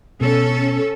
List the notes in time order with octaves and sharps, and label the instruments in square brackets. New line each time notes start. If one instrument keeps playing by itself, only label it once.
[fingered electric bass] B2 [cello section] C#4 A4